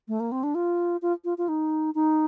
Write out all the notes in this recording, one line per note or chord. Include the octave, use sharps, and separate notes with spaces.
A3
A#3
C4
D4
F4
F4
F4
F4
D#4
D#4